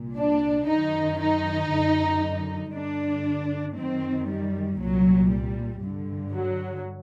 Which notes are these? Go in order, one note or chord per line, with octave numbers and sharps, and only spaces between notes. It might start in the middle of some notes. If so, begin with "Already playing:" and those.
Already playing: C2 A#2
D4
F#2 D#3 D#4
D#4
F#2 D3
G2 D3 D4
F#2 D#3 C4
G3
C2 A#2 F#3
G3
G2 D3
F#3